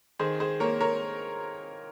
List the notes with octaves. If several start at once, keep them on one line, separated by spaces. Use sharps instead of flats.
D#3 G#4 C5
G#4 C5
A#3 A#4 C#5
A#4 C#5